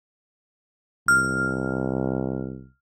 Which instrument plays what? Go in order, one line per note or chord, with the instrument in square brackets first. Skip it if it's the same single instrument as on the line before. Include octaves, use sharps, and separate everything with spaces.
[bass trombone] C2 [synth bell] F6